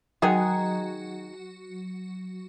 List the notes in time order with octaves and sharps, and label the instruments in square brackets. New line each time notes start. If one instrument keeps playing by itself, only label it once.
[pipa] D#3 G#3 D#4 G#4 [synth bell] F#3 F#4